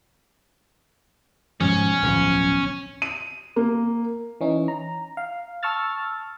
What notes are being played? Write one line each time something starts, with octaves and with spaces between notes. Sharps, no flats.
G#2 B2 F3 C#4
D1 B1 F3
D#7
A#3
E3 C#4 D#4
A#5
F5
A5 C#6 E6 F6 A6